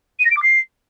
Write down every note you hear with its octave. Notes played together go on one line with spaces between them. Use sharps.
D#7
A#6
D7
D6
C7